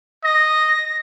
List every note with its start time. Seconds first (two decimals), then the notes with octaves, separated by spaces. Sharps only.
0.24 D#5 A#6